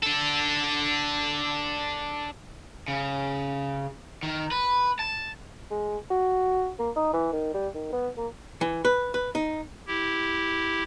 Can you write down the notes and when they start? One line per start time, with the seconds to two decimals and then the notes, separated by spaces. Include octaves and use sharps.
0.03 D4 A4
2.88 C#3
4.23 D#3
4.51 B4
4.99 A5
5.71 G#3
6.10 F#4
6.79 A#3
6.96 D#4
7.13 E3
7.32 D#3
7.54 G3
7.75 D#3
7.92 B3
8.17 A#3
8.61 E3
8.85 B4
9.14 B4
9.35 D#4
9.87 E4 G4